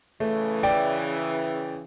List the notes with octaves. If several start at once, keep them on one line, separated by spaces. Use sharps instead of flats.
C#3 E3 A3
D5 G5